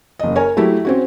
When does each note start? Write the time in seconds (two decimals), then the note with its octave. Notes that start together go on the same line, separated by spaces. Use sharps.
0.19 F#1 D#5
0.36 A#4 C#5 G#5
0.57 F#3 A3 E4 G4
0.85 C4 C#4 F#4